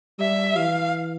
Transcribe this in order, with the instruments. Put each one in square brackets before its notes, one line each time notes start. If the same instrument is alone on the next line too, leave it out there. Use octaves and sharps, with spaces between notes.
[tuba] G3 [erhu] E5
[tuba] E3 [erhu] F5